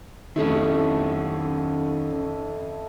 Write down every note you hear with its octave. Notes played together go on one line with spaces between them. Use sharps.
F2 D#3 A3 C#4 E4